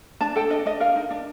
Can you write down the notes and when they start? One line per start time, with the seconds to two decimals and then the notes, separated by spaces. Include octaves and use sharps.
0.21 D4 A5
0.36 A4 G5
0.50 D4 D#5
0.66 D4 D#5
0.80 A#4 F5
0.96 D#4
1.11 D4